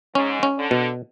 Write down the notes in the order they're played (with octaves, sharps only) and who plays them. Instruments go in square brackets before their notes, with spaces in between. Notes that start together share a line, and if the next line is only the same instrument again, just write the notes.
[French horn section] G#2 [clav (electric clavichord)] C#4
[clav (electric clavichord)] C#4
[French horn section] D3
[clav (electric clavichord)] B2